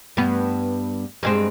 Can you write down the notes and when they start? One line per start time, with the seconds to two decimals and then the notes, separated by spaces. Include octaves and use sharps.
0.17 G2 B3
1.23 G2 G#3 C4